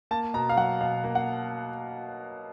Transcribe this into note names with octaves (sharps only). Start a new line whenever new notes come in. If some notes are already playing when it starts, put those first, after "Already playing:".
A#3 A5
B2 A#5
F5
F#3 F#5
B2 F5
A#3
F#5